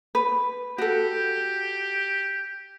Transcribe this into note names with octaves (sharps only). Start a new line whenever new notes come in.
B4
F#4 G4 A4